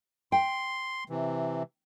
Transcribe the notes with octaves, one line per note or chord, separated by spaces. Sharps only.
G5 C6
C3 E3